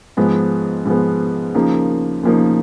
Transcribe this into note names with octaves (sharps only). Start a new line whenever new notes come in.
G#2 F3 G#3 B3
G#2 F3 G#3 B3
D#2 C#3 F3 A#3 D#4
D#2 C#3 F3 A#3 D#4